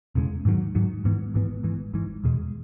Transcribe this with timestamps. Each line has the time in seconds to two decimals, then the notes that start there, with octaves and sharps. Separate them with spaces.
0.15 E1 E2 C#3 G#3
0.45 G#2 D#3 F#3
0.75 G#2 D#3 F#3
1.04 G#1 G#2 E3 B3
1.34 G#1 G#2 E3 B3
1.63 G#1 G#2 E3
1.94 G#1 G#2 E3
2.24 E2 B2 G#3